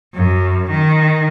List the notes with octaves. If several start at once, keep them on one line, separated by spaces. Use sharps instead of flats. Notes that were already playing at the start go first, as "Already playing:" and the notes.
F#2
D#3